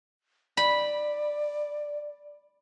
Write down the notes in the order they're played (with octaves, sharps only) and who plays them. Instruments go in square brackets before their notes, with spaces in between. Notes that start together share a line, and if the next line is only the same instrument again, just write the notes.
[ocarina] D5 [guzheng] B5